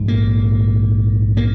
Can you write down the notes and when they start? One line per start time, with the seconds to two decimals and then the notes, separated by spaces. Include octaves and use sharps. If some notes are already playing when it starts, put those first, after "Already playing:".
Already playing: A#1 G#2
0.08 A#3
1.37 A#3